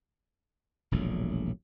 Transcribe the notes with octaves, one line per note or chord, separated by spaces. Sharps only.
E1 A#1 A2 F#3